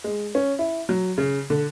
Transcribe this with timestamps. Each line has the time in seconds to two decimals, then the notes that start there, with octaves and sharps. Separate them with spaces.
0.04 G#3
0.35 C#4
0.59 E4
0.89 F#3
1.18 C#3
1.50 D3